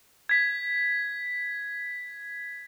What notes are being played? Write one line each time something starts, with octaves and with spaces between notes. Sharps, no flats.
G#6 B6